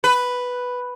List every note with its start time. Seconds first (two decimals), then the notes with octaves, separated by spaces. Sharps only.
0.04 B4